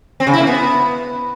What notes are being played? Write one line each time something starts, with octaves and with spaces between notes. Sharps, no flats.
C4
C#3
E4
A#3
B3